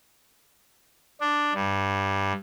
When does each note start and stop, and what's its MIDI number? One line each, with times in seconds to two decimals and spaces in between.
1.21 1.53 62
1.54 2.33 43